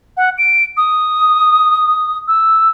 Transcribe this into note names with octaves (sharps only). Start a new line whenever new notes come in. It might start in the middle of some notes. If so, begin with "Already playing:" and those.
F#5
D7
D#6
E6